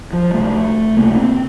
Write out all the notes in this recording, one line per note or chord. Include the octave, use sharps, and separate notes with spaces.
F3
C#2 C3 A3
C#2 C3 A#3
C4